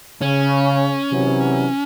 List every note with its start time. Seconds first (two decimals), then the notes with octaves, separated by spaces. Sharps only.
0.22 C#3 C#4
1.12 C3 E3 F#3